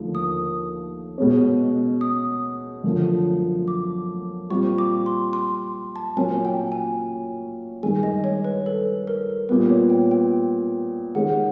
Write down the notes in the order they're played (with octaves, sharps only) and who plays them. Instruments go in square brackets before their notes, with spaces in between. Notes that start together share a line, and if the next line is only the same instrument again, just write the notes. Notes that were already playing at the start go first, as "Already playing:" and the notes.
Already playing: [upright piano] D#2 D3 F3 A3
[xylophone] D#6
[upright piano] B2 G#3 C#4
[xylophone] D#6
[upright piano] F#2 D3 F3
[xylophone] D6
[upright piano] A#2 G3 C4 F4 [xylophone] C#6
[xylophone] D6
C6
C6
A5
[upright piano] A#2 F#3 A#3 C#4 F4 [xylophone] G#5
[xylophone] G5
G#5
[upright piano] G2 D#3 G#3 [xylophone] G#5
[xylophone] D#5
C#5
B4
A4
A#4
[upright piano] A#2 G3 B3 [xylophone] B4
[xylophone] C#5
G5
G5
[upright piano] D#3 G#3 C#4 [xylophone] F#5